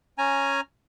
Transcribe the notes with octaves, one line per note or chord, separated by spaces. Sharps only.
C#4 G#5 A#5